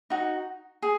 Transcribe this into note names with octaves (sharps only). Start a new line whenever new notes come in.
D#4 F#4
G#4